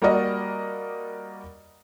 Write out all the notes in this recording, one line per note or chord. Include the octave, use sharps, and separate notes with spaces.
G3 A#3 F#4 A#4 D5 D#5